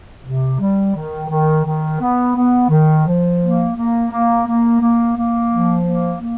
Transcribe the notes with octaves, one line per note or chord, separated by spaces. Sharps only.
C3
G3
D#3
D#3
D#3
B3
B3
D#3
F3
A#3
A#3
A#3
A#3
A#3
A#3
F3
A#3
A#3